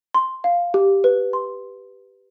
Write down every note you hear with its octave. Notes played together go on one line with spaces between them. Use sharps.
C6
F5
G4
B4
C6